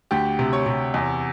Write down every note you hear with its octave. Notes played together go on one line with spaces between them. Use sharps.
D2 G4
C3
C#5
C3
E2